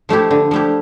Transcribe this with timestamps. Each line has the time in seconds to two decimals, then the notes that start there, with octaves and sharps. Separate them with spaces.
0.09 F3 A3 E4 G4
0.31 D3
0.51 F3 A3 E4 G4